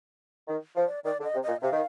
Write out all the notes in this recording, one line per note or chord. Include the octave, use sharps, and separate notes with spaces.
D#3
F3
D5
D#3 D5
D3
D#5
C3
A#2 D#5
C3 F5
D#3